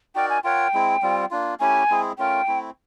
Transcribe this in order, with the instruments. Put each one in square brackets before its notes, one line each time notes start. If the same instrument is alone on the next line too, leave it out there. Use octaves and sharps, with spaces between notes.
[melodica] D#4 F#4 A#4 D5 [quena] G5
[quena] G#5
[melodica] F4 A#4 C#5 F#5 [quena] G5
[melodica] G#3 C4 E4
G3 C4 F4
A#3 D4 F4
[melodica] A3 C#4 E4 G4 [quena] G#5
[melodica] G#3 C4 E4 G#4
[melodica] A3 C#4 F4 A#4 [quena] G5
[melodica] A3 C4 E4